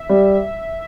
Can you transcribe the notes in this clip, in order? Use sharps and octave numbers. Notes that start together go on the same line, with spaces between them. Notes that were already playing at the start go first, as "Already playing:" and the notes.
Already playing: E5
G3